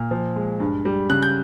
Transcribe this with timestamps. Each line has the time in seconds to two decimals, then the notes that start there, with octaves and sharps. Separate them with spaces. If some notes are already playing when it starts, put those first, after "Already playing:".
Already playing: A#2 F6
0.11 F3
0.36 G#3
0.60 G2
0.85 G3
1.10 C#3 F#6
1.22 G6